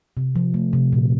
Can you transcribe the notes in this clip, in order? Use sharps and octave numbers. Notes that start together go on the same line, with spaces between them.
C3
F3
A3
C3
A#2